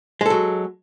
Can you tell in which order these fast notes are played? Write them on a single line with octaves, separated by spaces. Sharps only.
G#3 A4 F#3